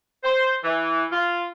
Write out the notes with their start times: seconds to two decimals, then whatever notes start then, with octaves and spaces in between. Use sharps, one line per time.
0.24 C5
0.63 E3
1.11 F4